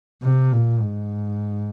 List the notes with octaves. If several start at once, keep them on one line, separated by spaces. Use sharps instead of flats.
C3
A#2
G#2